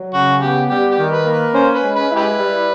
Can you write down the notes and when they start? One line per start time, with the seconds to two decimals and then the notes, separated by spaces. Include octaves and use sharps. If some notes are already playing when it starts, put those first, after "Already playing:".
Already playing: F#3
0.14 C#3 F#4
0.42 B3 G4
0.69 G3 G4
0.91 G4
0.98 D#3
1.12 B4
1.25 A#3
1.33 B4
1.53 C#4 C5
1.74 B4
1.82 G#3
1.96 B4
2.10 E4
2.16 G4 B4
2.37 G3